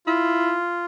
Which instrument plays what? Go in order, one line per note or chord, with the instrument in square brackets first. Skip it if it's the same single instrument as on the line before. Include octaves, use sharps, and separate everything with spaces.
[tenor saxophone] E4 [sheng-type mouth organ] F4